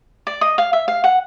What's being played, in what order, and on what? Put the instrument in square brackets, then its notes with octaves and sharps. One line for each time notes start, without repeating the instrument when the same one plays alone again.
[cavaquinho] D5
D#5
F5
E5
F5
F#5